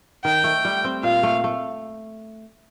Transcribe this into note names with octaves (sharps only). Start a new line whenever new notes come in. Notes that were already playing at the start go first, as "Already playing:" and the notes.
D#3 G5
A3
G3
C4
A#2 F5
A3
A3